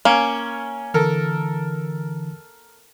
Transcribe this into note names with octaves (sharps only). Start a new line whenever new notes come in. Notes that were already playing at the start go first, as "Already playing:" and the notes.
A#3 C#4
D3 E3 A4 A#4